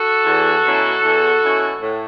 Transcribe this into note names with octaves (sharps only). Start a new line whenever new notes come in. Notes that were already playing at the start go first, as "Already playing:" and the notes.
Already playing: F#4 A4
E2
B2 F#3 C#4 E4
E2
B2 F#3 C#4 E4
A2